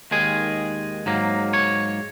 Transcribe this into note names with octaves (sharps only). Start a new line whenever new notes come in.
D#2 D#3 G#3 G#4
G#2 F#3 A#3
C#5